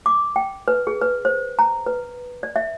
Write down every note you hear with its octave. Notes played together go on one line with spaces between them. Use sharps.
D6
G5
B4
G#4
B4
C5
A#5
B4
D5
E5